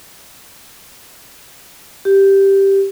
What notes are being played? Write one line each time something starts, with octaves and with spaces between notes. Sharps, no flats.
G4